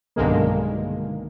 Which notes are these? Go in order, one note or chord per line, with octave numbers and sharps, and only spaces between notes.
B1 G2 D3 D#3 G#3 A#3